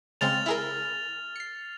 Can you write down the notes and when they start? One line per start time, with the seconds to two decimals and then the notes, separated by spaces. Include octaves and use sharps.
0.21 C#3 G#3 C4 F6 A6 F7
0.46 E4 G#4 A#4
1.36 C7 C#7